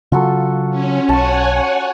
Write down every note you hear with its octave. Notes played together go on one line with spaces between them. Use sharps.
C#3 F#3 F4 F#4 A4
C#4
B1 C#5 F#5 G#5 A5 C#6